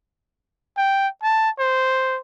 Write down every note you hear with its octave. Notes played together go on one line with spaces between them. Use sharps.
G5
A5
C5